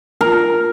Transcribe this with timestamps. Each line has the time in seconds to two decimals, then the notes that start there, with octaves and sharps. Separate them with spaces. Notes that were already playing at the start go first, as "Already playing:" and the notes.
0.21 A#4